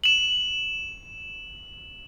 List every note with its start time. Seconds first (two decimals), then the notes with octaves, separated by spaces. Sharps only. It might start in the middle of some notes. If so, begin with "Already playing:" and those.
0.04 E7 F#7